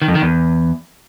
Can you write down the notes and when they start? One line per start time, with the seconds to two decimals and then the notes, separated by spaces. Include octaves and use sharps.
0.02 D#3
0.08 F2
0.15 D#3
0.22 E2